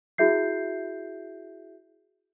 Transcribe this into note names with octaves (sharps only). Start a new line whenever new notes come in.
E4 F#4 G#4 E5 G6 C7